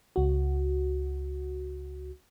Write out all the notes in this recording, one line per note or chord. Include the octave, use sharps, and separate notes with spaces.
C#2 F#4